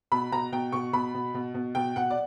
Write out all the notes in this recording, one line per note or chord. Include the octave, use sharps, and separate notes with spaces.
B2 B5
B2 A#5
B2 G5
B2 C#6
B2 B5
B2
B2
B2
B2 G5
B2 F#5
D5